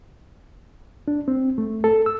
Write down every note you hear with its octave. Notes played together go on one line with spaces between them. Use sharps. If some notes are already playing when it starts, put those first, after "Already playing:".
D4
C4
A3
A4
E6